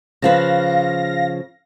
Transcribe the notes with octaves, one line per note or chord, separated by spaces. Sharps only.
C#3 F3 B4 F5 A#6